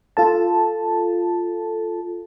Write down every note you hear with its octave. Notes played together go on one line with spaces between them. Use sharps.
F4 A4 A5